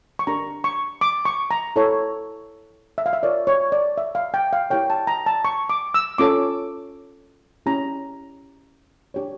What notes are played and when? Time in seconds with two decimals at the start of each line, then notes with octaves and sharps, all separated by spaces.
0.19 C#6
0.27 D4 G4 A#4 A#5
0.64 C#6
1.01 D6
1.25 C#6
1.51 A#5
1.76 E4 A4 C#5
2.98 E5
3.06 F5
3.13 E5
3.23 F4 A#4 C#5 D5
3.47 C#5
3.72 D5
3.98 E5
4.15 F5
4.34 G5
4.53 F5
4.70 E4 G4 A#4 C#5 G5
4.90 A5
5.07 A#5
5.26 A5
5.45 C#6
5.70 D6
5.94 E6
6.18 C#4 F4 A4 C#5 D6
7.66 C#4 E4 G4 A#5
9.14 D4 G4 C#5